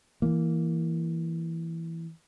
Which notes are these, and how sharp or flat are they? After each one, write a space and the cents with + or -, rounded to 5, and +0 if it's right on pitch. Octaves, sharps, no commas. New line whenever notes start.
E3 +0 A#3 +0